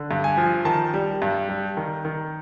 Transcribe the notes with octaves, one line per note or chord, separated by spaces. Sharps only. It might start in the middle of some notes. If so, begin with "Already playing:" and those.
Already playing: D3
G2
G#5
F3
D#3 A5
G3
G2
G3
D#3
D#3